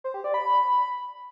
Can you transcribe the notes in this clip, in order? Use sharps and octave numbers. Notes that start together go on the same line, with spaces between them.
C5
G4
D5
B5